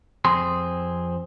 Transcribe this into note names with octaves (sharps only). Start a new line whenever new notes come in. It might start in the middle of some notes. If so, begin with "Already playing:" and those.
F2 C4 G#4 C6